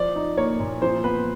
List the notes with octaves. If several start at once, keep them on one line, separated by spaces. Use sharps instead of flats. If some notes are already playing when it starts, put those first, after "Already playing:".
Already playing: F3 D5
D#4
A#3 C#5
A#2
F3 C5
B3 B4